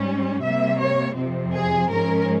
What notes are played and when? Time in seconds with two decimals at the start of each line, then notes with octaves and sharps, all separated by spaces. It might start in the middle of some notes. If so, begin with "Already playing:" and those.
Already playing: G#2 G3 C#4
0.43 C3 G3 A#3 E5
0.80 C#5
1.16 F2 C3 F3 C4
1.53 G#4
1.90 G#2 F3 G#3 C#4 A#4